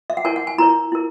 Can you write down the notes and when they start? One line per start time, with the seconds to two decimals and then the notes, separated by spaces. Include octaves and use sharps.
0.10 E5
0.17 F#5
0.25 E4 A#4 C#5 G#5
0.36 F#5
0.47 G#5
0.58 E4 A#4 C#5 A#5
0.92 E4 A#4